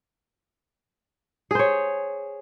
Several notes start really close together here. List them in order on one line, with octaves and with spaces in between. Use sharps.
G#4 C5 C#5